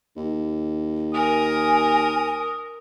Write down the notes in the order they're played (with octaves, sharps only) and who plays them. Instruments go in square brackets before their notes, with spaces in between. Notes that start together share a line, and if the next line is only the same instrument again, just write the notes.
[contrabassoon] D#2
[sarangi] A#4 [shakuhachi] G#5 [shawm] D#6